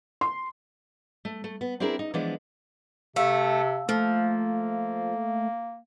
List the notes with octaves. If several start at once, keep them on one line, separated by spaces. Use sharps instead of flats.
C6
A3
A3
B3
C4 D4 E4 G#4 A#4
D#4
E3 F3 G#3 B3 D4
C3 A3 F5 E6
F3 A3 A#3